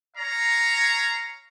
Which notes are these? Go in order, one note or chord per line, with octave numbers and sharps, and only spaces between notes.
C#5 F5 A#5